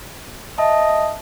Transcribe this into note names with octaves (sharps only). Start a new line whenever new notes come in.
D#5 E5 A5